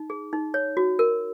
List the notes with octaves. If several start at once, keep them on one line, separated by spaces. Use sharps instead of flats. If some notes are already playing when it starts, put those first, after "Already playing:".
Already playing: D#4
G#4
D#4
C#5
F#4
A#4